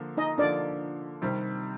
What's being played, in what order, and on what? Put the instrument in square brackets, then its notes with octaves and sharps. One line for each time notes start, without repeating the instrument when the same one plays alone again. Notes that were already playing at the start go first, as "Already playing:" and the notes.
Already playing: [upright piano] D3 F3 A#3
[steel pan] D#4 D#5
[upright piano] D3 F3 A#3 [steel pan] D4 D5
[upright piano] C3 D#3 G3 C4